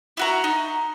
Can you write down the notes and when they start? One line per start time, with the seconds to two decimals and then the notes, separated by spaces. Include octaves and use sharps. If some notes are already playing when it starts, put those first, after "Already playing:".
0.17 E4 F#4 A#5
0.44 D#4